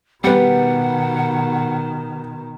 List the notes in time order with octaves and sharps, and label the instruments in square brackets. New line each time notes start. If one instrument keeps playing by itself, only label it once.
[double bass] B2 D#3 [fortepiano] G3 B3 [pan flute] F#5